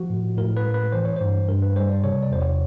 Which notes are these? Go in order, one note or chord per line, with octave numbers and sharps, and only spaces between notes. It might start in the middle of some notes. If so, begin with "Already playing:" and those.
Already playing: F3 F#4
A2
A2 A#4
B4
G#3
B4
E3 C5
C#5
G2 C5
G2 A#4
B4
G3 C5
D5
C3 C#5
D5
E2 C5
C#5